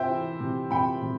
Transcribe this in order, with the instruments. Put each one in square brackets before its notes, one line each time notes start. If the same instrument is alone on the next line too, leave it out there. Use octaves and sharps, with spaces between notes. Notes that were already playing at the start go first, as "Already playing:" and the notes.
Already playing: [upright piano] C3 C5 E5 G5
E3
C3
C3 G5 B5
C3